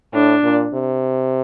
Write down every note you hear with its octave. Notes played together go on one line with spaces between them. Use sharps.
A2 D4
A#2
C3